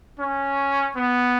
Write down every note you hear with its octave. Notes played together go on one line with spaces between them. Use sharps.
C#4
B3